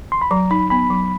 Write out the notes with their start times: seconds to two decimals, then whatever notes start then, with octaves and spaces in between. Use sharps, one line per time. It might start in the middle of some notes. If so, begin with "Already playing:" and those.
0.12 C6
0.21 B5
0.31 F#3 A#5
0.51 D#4 B5
0.70 B3 B5
0.90 F#3